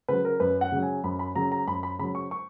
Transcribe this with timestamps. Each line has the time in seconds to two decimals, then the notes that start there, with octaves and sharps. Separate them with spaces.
0.08 C#3 F#3 B4
0.25 A#4
0.40 F#2 B4
0.61 F#5
0.72 C#3 F#3
0.83 G#5
1.04 F#2 B5
1.19 B5
1.35 C#3 F#3 A#5
1.52 A#5
1.67 F#2 B5
1.83 B5
1.99 C#3 F#3 B5
2.15 C#6
2.31 C#6